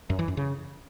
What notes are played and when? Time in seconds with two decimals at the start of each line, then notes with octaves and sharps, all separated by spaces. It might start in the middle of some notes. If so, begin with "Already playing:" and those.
0.10 F#2
0.19 E3
0.28 F#2
0.37 C#3